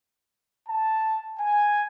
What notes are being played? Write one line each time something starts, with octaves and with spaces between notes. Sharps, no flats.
A5
G#5